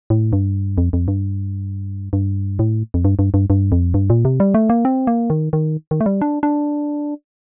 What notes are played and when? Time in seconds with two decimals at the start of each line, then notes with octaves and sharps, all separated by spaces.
0.10 A2
0.33 G2
0.78 F2
0.93 F2
1.08 G2
2.13 G2
2.59 A2
2.94 F2
3.05 G2
3.19 G2
3.34 G2
3.50 G2
3.72 F2
3.94 G2
4.10 A#2
4.25 C3
4.40 G3
4.54 A3
4.70 A#3
4.85 C4
5.07 A#3
5.30 D#3
5.53 D#3
5.91 D#3
6.01 A3
6.06 G3
6.21 D4
6.43 D4